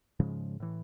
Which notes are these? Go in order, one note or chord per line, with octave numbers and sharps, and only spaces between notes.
G#2 C#3 F3 G#3
A2 E3